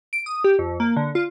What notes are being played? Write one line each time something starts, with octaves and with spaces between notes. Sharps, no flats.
D7
D#6
G4
F2
A#3
D3
F4